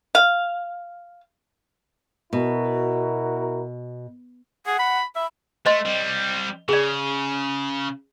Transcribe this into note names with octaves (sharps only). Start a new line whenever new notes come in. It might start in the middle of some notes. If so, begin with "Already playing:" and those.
F5
B2 E4 F#4 A#4
G#4 F#5
B5
E5 B5
A3 C5 D#5 C6
G3 C4
C#3 G#4 D5